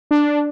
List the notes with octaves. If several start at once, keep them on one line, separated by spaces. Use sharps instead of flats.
D4